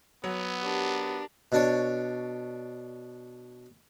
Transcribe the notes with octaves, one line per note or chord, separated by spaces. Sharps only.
F#3 B3
D4 G4 A#4
B2 D4 C#5